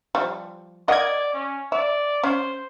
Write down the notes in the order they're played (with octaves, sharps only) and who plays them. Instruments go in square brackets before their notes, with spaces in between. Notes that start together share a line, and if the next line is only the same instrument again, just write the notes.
[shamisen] F3 G3
[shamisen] A#4 F#5 [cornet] D5 [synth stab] D#5 G#6
[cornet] C#4
[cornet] D5 [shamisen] E5
[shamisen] C#4 [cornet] C5